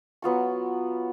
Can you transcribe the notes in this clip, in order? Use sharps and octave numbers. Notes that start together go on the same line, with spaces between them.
F#3 B3 F4 C#6